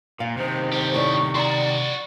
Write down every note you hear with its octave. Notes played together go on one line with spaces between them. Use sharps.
A#2 F5
C3 D#3 C5
D3 G4 C5
A2 D5 C#6
E4 F#4 D5 A#5 C6